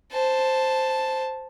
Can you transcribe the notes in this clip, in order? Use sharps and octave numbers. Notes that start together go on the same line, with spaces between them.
C5 A5